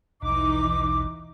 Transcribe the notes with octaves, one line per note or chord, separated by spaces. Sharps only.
A#1 D#2 B2 E3 D#4 D6